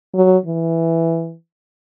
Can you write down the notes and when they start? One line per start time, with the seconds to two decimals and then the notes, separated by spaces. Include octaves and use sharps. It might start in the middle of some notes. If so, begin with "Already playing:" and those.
0.14 F#3
0.46 E3